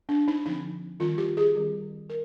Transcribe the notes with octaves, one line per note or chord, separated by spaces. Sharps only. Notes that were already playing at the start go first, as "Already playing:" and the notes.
D4
D#4
D3 F3 C4 D#4
D#3 G3 C4 F4
G4
G#4
D#3 G3 C4
A#4